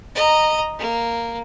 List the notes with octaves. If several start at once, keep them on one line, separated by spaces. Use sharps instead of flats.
D#5 A#5
A#3